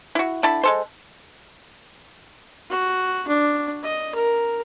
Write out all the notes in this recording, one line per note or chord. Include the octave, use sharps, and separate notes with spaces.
E4 F#4
D3 E4 A5 B5
G#3 A4 C5
F#4
D4
D#5
A#4